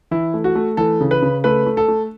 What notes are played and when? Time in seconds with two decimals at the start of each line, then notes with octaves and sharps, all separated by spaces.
0.11 E3 E4
0.34 A3
0.44 F#4
0.55 A3
0.77 E3 A4
1.01 C#3
1.11 B4
1.22 C#3
1.44 A3 B4
1.66 A3
1.77 A4
1.88 A3